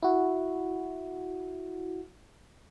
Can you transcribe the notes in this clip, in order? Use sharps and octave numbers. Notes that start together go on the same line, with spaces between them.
E4 F#4